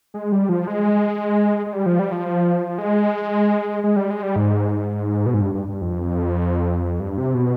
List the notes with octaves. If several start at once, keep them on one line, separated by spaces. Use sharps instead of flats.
G#3
G3
F3
G#3
G#3
G3
F3
G3
F3
G#3
G#3
G3
G#3
G3
G#2
B2
G#2
G2
G2
G2
F2
G2
C3
B2